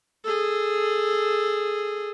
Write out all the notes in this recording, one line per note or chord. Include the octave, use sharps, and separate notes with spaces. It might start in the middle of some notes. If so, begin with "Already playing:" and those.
G#4 A4